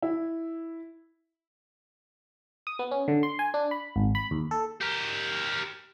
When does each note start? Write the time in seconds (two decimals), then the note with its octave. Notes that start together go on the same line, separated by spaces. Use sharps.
0.03 E4
2.67 D#6
2.79 B3
2.91 C#4
3.08 D3
3.23 C6
3.39 G#5
3.54 D4
3.71 B5
3.96 G#1
4.15 B5
4.31 D#2
4.51 A4
4.81 G4 A#4